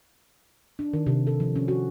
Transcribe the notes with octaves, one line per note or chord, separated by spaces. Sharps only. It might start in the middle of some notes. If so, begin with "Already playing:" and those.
D4
D#3
C3
A4
F3
C#4
F#4